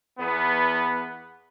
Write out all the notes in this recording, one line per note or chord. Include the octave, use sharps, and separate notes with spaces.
E2 B3